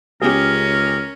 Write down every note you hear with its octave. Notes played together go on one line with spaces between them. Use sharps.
C#2 C#4 G4 G#4 A#4